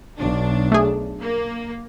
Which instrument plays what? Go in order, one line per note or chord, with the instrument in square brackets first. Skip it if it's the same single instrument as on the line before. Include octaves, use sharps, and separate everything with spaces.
[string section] B1 D4
[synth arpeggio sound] A3 G#4
[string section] A#3